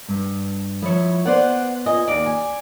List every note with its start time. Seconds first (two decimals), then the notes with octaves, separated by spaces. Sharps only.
0.08 G2
0.82 F3 E4 C#5
1.25 B3 C5 D5 F#5
1.86 F2 D#5 G#5
2.08 D#2 D5
2.26 G#5